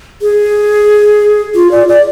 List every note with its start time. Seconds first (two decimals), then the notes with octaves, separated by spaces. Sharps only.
0.22 G#4
1.55 F4
1.71 D5
1.88 D5